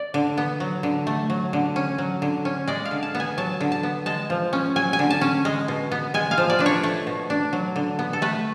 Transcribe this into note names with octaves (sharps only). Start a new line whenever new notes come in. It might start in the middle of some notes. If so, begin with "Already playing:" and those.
Already playing: D5
D3
B3
F#3
D3
A3
F#3
D3
C#4
F#3
D3
C#4
G#3 D5
F5
D3
A5
B3
G#5
F#3 A5
D3
A5
B3
G#3 A5
F3
C#4
F#3 G#5
G#5
D3
A5
C#4
G#3
B2
B3
G#3 G#5
F5
F3
D5
D4 B4
C#5
A3
B2
D4
F#3
D3
B3
A4
A3 B4